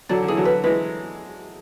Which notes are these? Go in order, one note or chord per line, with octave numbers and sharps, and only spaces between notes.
D3 F#3 D5
D3
E3 G#4
D3 F#3
B4
E3 G#3 B4